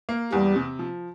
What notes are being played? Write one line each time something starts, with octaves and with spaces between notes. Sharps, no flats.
A#3
E2 G3
C3
F3